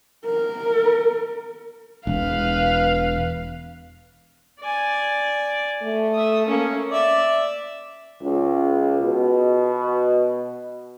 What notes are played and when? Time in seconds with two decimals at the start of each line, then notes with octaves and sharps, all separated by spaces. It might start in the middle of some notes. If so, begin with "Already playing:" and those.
0.25 A#4
2.07 E1 B4 F5
4.60 D5 G#5
5.82 A3
6.14 E5 D#6
6.47 A#3 C#4
6.91 D5 E5
8.23 C#2
9.02 B2